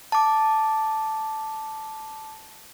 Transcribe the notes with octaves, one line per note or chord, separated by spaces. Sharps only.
A5 D6